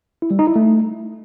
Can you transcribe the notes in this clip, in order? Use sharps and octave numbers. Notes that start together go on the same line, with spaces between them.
E4
G3
D#4
E4
A3